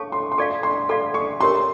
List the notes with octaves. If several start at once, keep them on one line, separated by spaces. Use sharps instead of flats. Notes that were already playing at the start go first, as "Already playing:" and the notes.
Already playing: A4 C#5 F5 A5 C#6
C6
C6
A4 D5 F5 C#6
C6
A4 D5 F5 C6
C#6
E4 G4 A#4 C#5 C6